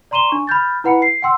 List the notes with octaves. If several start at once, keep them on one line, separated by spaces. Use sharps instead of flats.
D5 A#5 C6 D#7 E7 G7
D4 C#6
B5 F6 G6 A6
E4 B4 F#5 B5 C#7
C7
F#5 G5 C6 E6